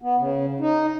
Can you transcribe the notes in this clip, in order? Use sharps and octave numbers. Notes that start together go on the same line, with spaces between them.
B3
C#3
D#4